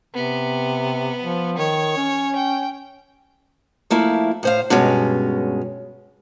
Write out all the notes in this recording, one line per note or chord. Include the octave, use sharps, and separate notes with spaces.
C3 B3
F3
D#3 C#5
C#4
G5
F3 A3 A#3 E4
A2 C5 F5
G2 B2 G#3 C#4